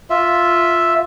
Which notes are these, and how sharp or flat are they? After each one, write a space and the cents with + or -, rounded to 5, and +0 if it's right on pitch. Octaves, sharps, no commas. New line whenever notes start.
F4 +0 E5 +0